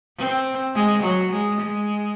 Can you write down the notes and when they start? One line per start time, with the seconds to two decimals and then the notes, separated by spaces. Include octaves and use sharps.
0.18 C4
0.76 G#3
1.03 F#3
1.32 G#3
1.61 G#3